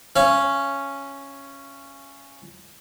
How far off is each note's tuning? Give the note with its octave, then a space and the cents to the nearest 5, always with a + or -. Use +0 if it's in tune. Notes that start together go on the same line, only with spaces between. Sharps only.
C#4 +0 F5 -40